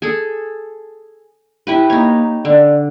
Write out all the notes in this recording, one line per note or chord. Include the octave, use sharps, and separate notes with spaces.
G#4 A4
E4 G4 B4
A#3 D#4 C#5
D3 D5